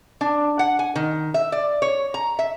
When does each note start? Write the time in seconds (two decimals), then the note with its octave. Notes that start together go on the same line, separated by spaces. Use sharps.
0.21 D4
0.59 F#5
0.79 G#5
0.96 D#3
1.34 E5
1.52 D5
1.82 C#5
2.14 A#5
2.39 E5